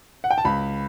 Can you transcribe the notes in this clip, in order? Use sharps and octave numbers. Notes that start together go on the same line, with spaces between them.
F#5
G5
A5
C#2 B5